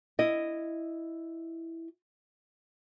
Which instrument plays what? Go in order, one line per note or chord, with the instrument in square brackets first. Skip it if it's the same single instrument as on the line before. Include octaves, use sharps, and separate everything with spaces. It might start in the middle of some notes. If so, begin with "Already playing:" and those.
[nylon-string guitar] E4 D#5